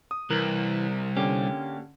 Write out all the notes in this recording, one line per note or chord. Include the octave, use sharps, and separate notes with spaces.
D#6
C2 E3 A#4
D3 A#3 C#4 G4